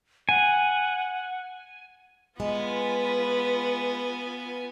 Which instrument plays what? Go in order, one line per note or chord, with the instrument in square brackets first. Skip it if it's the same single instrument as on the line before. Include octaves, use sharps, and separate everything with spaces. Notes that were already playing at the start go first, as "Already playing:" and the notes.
[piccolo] F#5 [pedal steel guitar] G#5
[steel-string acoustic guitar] G#3 [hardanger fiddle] B3 G#5 [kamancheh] F4 B4